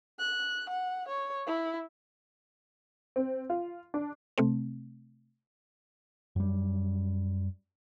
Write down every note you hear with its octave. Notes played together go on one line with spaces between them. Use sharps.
F#6
F#5
C#5
E4
C4
F4
D4
C3 A3 C4
F#2 G3